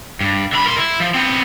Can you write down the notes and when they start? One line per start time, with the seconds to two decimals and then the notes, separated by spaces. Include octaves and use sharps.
0.21 G2
0.53 D3 B5
0.66 A#4 C6
0.78 E4
1.00 F3
1.14 B3 C4